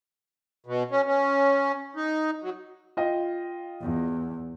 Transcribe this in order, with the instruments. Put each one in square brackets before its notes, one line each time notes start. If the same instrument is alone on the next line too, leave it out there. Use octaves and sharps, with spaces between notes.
[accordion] B2
C#4
C#4
D#4
F#3
[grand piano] F4 D#5 G5
[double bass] E2